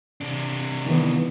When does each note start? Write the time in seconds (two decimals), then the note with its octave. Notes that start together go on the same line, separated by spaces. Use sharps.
0.21 C3 D4
0.86 D#3 E3 B3